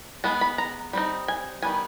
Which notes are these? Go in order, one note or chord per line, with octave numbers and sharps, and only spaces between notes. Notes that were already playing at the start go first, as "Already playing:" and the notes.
G#3 B3 A5
B5
A#5
G3 C4 D#4
G#5
D#3 G3 B3 G#5